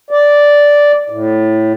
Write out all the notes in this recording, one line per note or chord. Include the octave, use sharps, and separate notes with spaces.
D5
A2